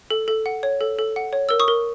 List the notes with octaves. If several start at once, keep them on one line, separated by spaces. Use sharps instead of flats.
A4
A4
F#5
C#5
A4
A4
F#5
C#5
A#4 E6
C#6 D#6
A#4